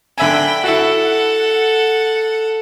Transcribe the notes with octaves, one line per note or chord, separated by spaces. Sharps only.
D3 E5 G5 G#5 B5
E4 F#4 A4 F#5